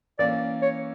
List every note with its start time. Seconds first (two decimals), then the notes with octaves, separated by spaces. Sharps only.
0.19 E3 A#3 C#4 D5
0.62 C#5